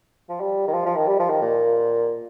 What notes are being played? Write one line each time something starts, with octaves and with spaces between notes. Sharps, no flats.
F3
G3
D#3
F3
F3
D#3
G3
F3
D#3
A#2